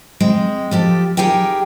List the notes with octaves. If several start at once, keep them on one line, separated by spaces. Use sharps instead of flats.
G#3 C4
F3 G4 A4
D#4 G4 G#4 A#4 G5